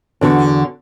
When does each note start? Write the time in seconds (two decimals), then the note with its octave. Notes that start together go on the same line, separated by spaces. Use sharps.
0.21 E2 D3 F#4